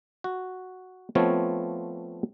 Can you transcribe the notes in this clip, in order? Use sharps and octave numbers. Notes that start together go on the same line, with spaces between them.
F#4
F3 A3 B3 C4 F4 C#5